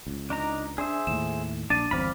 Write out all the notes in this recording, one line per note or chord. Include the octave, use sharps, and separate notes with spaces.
C#2
D4 D#4 A#5
D4 G#4 C5 E5
D#2 A2 E7
A#1 D4 A6 D#7
G1 E2 C4 D5 F5 B5